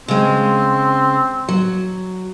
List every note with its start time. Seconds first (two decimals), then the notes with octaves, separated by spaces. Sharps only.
0.08 C#3 G#3 C4
1.49 F#3